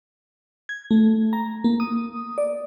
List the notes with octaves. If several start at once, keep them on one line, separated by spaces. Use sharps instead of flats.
G#6
A3
A#5
A#3
D#6
D5